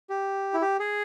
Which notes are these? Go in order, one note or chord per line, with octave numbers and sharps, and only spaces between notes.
G4
E4
G4
G#4